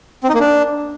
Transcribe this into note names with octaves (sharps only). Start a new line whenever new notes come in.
C4
D#4
A#3
D4